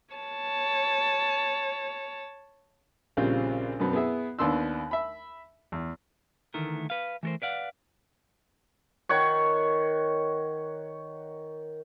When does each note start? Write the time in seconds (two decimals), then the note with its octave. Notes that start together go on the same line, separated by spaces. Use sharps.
0.14 C#5 A5
3.17 A#1 C#3 G3 C4 F4 C5
3.80 F#2 B2 B3 C4
3.93 B3 E4 G#4 E5
4.39 D#2 B3 D4 C6 E6
4.91 E5 B5
5.72 E2
6.54 D2 D#3 E3 A3 A#4
6.90 B4 F5
7.23 E3 A3 A4 A#4 C5
7.42 B4 D5 F5 F#5
9.09 D#3 C#5 F#5 C#6